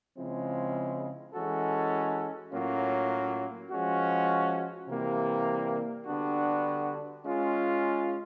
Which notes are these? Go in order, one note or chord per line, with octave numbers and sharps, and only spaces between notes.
C#3 F3 G#3 C4 E4
E3 G#3 C#4 F#4 A4
A2 F#3 A#3 C#4 F4
F3 G#3 C#4 F#4
C3 E3 G3 A#3
D3 G3 B3 D4 F#4
G#3 C#4 F4